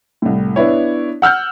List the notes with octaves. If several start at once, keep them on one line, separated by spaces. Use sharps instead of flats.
C2 A2
B3 D4 E4 C#5
F#5 E6 F6 G6